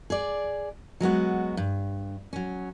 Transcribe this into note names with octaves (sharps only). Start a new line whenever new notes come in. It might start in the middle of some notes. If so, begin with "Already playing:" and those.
G#4 D5
F#3 G#3 B3 F#4
G2
F#3 C#4